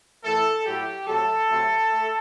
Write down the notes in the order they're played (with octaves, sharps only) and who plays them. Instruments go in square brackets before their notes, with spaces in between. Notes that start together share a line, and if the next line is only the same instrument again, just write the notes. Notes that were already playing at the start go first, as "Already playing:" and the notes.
[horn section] A2 E3 A3 A4
A2 F#3 A3 G4
C3 F#3 A3 A4
C3 F#3 A3
A3